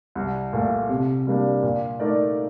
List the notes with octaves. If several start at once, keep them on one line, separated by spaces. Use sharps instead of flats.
C2
A#2 A3
C3
G3 A#3 D4
A#2
A3 D#4 A#4 D5